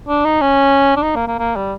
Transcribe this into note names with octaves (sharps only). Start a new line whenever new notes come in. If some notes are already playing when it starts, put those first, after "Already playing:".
D4
D#4
C#4
D4
D#4
A#3
A#3
A#3
G3